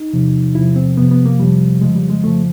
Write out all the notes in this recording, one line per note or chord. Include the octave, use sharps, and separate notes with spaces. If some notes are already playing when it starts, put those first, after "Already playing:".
Already playing: D#4
E2 C3 F3
E2 C3 F3 E4
C4
F2 C3 F3 B3
B3
A#3
F2 C3 F3 G3
F2 C#3 F3 G#3
G3
G#3
F2 C#3 F3 A3